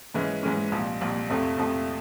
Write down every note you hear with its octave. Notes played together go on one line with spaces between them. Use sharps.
G#2 E3 G#3 C#4
G#2 E3 G#3 C#4
C2 A#2 F3
C2 A#2 F3
F2 C3 F3 A3
F2 C3 F3 A3